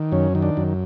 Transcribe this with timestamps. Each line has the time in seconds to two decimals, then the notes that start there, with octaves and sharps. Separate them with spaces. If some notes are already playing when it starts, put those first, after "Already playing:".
Already playing: D#3
0.12 F#2 C#4
0.35 D#3
0.42 D4
0.57 F#2